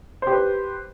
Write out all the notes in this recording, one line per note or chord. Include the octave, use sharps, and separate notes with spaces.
G4 B4 C5